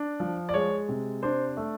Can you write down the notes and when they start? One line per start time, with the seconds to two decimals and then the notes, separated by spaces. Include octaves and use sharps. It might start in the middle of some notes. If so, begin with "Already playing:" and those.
Already playing: D4
0.20 F3
0.49 D5
0.54 G#3 C#5
0.89 C3
1.23 D4 C5
1.57 A3